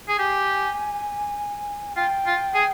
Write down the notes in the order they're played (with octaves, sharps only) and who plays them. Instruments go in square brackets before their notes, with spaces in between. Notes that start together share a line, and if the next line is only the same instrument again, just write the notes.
[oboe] G#4
[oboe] G4 [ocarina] G#5
[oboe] F4 [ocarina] G5
[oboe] F4
G#4